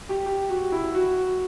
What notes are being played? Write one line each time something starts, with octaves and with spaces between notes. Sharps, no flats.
G4
G4
F#4
E4
F#4